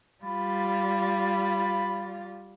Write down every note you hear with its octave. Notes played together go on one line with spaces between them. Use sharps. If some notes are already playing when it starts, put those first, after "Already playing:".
G3 F4 B5